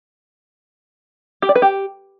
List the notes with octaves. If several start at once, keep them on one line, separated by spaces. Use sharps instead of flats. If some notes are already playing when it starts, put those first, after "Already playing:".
G4
D5
B4
G4